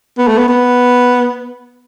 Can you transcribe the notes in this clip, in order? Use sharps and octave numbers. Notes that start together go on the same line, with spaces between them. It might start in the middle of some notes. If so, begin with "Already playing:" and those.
B3
A3
B3
B3